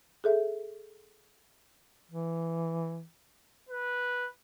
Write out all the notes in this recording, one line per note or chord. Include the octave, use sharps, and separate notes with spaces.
G#4 A4 E5
E3
B4